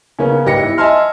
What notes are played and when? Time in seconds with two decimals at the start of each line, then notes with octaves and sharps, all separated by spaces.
0.19 C#3 A#3 B3 C#4
0.45 G1 G#2 G4 B4 A#6 C#7
0.59 E4
0.78 D#5 E5 G#5 A5 C6 F6